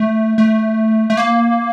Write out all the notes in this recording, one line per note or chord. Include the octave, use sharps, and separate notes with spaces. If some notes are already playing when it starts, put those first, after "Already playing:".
Already playing: A3
A3
A3
A#3